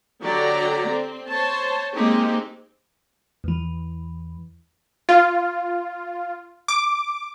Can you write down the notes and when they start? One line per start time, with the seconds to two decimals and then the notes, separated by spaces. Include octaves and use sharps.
0.22 D3 F#3 G4 A4 D5 A#5
0.87 C4
1.29 C5 C#5 A5
1.94 G#3 A#3 C4 D#4 G4
3.44 E2 E3
5.09 F4
6.68 D6